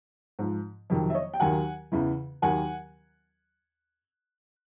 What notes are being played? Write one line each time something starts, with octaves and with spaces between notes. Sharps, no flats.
G#2 F3
F2 C3 D#3 F#3
E5
C#5 D#5
G5
D#2 D#3 F#3 F#5 G#5
E2 C#3 E3
D#2 D#3 F#3 F#5 G#5